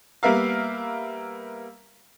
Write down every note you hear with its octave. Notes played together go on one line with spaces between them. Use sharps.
G3 A#3 B3 A#4 E5 F5